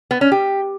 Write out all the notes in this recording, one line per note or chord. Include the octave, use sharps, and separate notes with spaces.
B3
C#4
G4